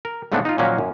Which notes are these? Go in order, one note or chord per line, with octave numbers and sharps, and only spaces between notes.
A#4
G#2 C#3 A3 B3 C4 D4
D#4 F4
A#2 D#3 F3 F#3 A#3 C#4
F#2